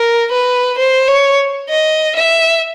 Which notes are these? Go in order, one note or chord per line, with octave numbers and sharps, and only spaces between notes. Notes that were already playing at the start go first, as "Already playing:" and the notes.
Already playing: A#4
B4
C5
C#5
D#5
E5